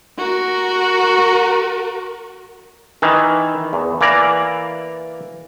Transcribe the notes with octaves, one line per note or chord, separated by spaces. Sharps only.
F#4 A#4
D#3 E3
E2
E3 A#3 D5 A#5